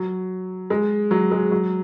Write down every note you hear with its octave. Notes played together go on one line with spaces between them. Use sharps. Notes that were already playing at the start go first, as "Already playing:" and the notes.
Already playing: F#3
G#3
F#3
G#3
F#3